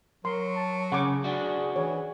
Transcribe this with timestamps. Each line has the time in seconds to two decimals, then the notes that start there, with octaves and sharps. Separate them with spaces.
0.25 F#3 A#4 C6
0.56 A5
0.92 C#3 G#4 F#5 C#6 D6
1.24 D4 F#4
1.76 E3 C#5